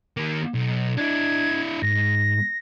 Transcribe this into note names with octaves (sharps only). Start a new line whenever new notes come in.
D#3 A#3
B1
D4 E4 G#6
G#2 A#6